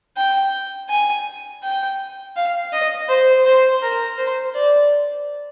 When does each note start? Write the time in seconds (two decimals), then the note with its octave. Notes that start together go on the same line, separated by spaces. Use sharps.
0.17 G5
0.90 G#5
1.63 G5
2.36 F5
2.72 D#5
3.09 C5
3.45 C5
3.82 A#4
4.18 C5
4.55 D5